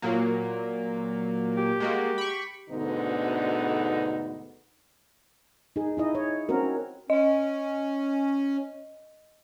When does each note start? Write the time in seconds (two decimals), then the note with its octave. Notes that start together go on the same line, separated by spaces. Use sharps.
0.02 A#2 F#3 A#3
1.57 G4
1.80 G#3 A#3 F#4
2.18 B5 C#6
2.70 D2 G#2 B2 D3 B3 D#4
5.76 D#4 G#4
5.97 D#4 E4 D#5
6.15 C#5
6.49 C4 C#4 F#4 A#4
7.10 C#4 D#5